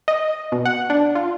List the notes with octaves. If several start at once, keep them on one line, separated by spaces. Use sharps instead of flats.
D#5
B2
F#5
D4
F4